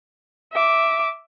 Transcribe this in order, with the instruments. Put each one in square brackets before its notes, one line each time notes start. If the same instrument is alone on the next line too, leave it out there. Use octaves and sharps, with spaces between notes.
[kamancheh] E5 D6